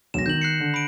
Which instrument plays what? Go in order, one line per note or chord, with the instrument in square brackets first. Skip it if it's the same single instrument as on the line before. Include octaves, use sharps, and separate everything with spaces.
[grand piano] E1 B1 [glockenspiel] A#6 E7
[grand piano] D#3 [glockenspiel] G6 F#7
[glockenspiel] F#6 C7 C#7
[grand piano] D3
[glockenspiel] B5 D7